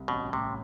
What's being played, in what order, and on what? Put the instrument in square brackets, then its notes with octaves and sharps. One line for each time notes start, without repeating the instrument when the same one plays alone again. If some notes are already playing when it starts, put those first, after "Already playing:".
Already playing: [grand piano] C2
[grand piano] A1 [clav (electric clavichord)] B2
[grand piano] A2 [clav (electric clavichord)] C3